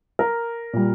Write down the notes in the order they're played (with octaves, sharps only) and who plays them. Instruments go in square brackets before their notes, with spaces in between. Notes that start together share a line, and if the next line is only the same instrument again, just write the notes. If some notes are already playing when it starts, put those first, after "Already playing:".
[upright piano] A#4
A#2 G3